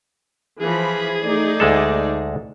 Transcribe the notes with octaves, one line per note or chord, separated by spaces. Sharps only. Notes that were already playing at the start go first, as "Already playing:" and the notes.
E3 F3 G#4 B5
A3 D#4 D5
D2 G#3 A4